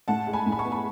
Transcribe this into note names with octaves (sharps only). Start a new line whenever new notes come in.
A2 F#5 A5
G#3
G#5 B5
A2
B5
A5 C#6
B3
B5